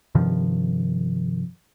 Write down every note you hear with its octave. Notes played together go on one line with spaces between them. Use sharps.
G2 C3 D#3 F3